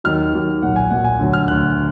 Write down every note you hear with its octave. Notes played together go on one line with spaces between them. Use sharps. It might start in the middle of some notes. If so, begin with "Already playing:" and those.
D#2 D#3 F#3 F6
D#2 D#3 F#3
B1 A#2 F#3 F#5
G#5
B1 A#2 F#3 F#5
G#5
D2 D3 F#3
F6
D2 D3 F#3 F#6